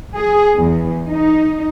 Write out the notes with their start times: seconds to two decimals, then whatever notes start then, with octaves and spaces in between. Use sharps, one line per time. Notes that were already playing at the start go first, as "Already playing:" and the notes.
0.16 G#4
0.58 E2
1.08 D#4